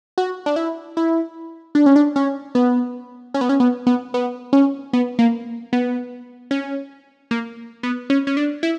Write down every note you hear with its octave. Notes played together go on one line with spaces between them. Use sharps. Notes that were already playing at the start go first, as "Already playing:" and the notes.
F#4
D4
E4
E4
D4
C#4
D4
C#4
B3
C#4
B3
C#4
B3
B3
B3
C#4
B3
A#3
B3
C#4
A#3
B3
C#4
C#4
D4
E4